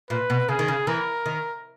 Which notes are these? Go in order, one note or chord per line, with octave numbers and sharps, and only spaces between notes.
A#2 B4
B2
C#3 G#4
D#3
C#3
E3 A#4
D#3